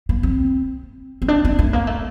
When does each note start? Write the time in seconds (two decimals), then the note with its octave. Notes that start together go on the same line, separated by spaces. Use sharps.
0.09 A#3
0.23 C4
1.22 C4
1.28 D4
1.45 C4
1.59 A3
1.73 A#3
1.87 A3